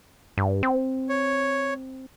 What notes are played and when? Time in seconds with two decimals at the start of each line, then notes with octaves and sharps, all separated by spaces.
0.38 G2
0.63 C4
1.09 C#5